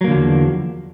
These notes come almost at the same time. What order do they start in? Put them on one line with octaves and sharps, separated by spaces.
F#3 A#3 D3 F3 E2